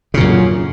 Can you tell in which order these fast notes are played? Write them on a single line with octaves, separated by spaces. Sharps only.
C#3 A#2 F#2